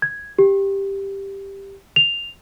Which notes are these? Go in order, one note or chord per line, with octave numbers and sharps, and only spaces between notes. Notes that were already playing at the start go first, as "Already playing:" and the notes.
G#6
G4
F7